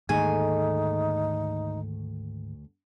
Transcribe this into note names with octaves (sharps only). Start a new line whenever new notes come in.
D2 G#2 D#3 A3 A#3 D#4 G#4 G#5